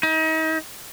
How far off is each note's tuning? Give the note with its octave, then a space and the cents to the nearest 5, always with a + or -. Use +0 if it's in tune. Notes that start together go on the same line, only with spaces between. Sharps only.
D#4 +35